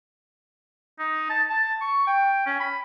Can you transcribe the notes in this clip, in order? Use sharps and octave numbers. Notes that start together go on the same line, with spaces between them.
D#4
A5
A5
C#6
G5
C#4
B5